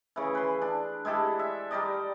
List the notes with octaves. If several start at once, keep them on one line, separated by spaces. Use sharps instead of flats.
C#3 E3
B4 C6
D4
G#3 E4 G4 A4
E5
G3 D#4 D5 D#5